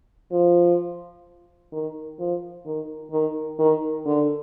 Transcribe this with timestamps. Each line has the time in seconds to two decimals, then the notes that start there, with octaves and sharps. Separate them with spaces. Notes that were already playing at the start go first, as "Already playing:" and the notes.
0.32 F3
1.72 D#3
2.19 F3
2.65 D#3
3.12 D#3
3.59 D#3
4.06 D3